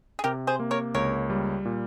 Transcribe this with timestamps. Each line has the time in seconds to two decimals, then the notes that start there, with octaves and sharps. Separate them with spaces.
0.19 G#4
0.24 C3 G4 A#4
0.47 G#4 C5
0.60 A#3
0.71 A#4 C#5
0.94 C#2 A#4 C#5
1.30 G3
1.65 A#2